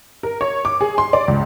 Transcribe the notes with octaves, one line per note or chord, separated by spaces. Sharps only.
A#4
C#5
D6
G#4
C6
D5
C#2